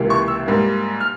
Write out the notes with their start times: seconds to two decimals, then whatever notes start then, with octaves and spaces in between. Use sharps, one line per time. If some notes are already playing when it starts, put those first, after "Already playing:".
Already playing: C#2 C3 E3 A#3
0.10 C#6
0.28 E6
0.46 G#2 G3 A#3
1.00 F6